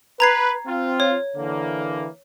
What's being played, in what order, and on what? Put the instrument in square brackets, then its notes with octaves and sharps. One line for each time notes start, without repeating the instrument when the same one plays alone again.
[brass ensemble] B4 [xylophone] A#5 G#6 C7
[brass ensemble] C4 F4
[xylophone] C#5
[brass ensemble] D3 E3 A#3